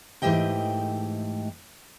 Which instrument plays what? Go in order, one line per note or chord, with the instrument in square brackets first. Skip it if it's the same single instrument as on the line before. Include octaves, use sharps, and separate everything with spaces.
[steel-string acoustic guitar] G#2 E3 A3 G4 D#5 G5